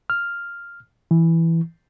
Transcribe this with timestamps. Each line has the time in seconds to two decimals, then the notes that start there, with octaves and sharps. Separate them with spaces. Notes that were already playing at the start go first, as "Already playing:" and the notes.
0.10 F6
1.11 E3